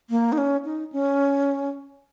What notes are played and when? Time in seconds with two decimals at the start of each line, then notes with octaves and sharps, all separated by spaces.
0.10 A#3
0.32 D#4
0.38 C#4
0.65 D#4
0.92 C#4